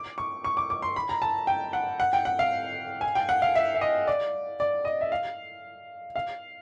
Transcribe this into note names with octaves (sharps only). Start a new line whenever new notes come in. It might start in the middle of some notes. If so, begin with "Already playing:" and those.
Already playing: D6
C#6
C#6
D6
D6
C6
B5
A#5
A5
G5
F#5
F#5
G5
F#5
F5
G#5
G5
F#5
F5
E5
E5
D#5
D5
D5
D#5
E5
F5
F5